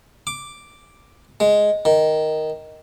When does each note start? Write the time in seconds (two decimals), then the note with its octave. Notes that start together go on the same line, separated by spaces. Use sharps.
0.27 D6
1.40 G#3
1.85 D#3